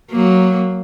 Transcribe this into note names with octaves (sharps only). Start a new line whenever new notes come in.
F#3 A#3